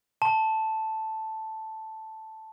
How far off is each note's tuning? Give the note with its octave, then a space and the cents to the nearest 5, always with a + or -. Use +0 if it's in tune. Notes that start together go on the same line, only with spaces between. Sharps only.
A5 +0 C6 +5